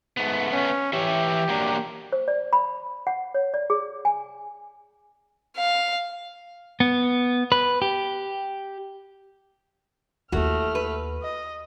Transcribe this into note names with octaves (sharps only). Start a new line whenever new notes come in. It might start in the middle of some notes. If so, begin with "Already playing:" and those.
G#2 A3 B3
C#4
E3 G4 C#5 E5
F#3 A#3 D4
C5
D5
B5
F#5
C#5
D5
G#4
G#5
F5
B3
B4
G4
D#2 A3 E4 F#4 F6
B4
D#5